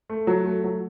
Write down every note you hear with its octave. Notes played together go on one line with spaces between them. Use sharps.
A3
F#3
A3
F#3